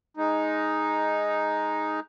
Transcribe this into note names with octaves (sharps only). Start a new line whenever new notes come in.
G#3 D#4